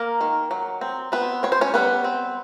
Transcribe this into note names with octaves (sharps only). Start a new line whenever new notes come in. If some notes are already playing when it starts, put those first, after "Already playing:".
Already playing: A#3 A#4
D#3
F#3
C4
B3 C4 B4
C4 C#5
C5
C#4 C#5
G3 B3 B4
C4